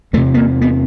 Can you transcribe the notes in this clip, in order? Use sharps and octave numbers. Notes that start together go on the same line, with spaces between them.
E2 C3 A3
B3
A#3
B3